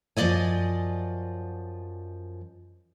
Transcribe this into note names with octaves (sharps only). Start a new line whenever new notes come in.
F#2 F3 G#3 D5 D#5 G#5